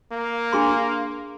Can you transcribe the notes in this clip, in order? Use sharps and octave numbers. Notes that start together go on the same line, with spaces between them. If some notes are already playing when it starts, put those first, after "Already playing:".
A#3
D4 G#4 C6